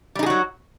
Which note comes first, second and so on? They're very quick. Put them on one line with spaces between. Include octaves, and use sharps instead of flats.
G3 D#4 G#4 F#4 F#3